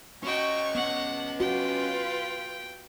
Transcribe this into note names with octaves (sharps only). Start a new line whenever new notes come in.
C#4 F#4 D#5 G5 C#6
B3 F#5
F4 F#4 B4 G5